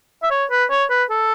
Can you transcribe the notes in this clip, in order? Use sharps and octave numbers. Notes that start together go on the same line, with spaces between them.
E5
C#5
B4
C#5
B4
A4